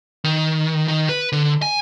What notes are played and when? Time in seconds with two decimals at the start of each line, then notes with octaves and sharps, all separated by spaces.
0.24 D#3
0.88 D#3
1.09 B4
1.32 D3
1.62 G#5